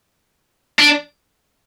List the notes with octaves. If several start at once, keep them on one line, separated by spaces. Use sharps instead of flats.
D4